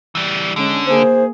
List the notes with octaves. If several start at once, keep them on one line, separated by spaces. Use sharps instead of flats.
E3 G3
D3 G#3 C#4
A#3 G#4 C5